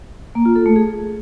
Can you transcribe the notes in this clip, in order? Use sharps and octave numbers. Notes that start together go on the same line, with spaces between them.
A#3
F4
A4
A3
G#4